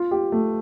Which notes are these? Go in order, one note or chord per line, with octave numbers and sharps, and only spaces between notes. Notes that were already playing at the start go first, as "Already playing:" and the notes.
Already playing: F4
G4
A3